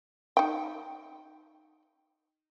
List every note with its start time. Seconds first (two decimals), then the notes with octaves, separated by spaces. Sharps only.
0.37 D#4 G5